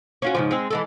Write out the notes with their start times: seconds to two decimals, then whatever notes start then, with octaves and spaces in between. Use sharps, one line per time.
0.22 C#4 F4 F#4
0.35 G#2 C#3 F3
0.51 G#3 C4
0.71 E3 G#3 A4